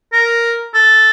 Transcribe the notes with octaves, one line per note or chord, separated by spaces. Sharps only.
A#4
A4